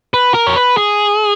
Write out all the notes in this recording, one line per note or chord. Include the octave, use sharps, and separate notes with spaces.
B4
A#4
C#5
B4
G#4